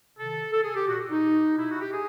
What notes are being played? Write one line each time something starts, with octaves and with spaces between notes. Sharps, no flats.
C3 D#3 A4
A4
G#4
G4
A#2 F#4
D#4
B2 E4
F#4
G4
G#4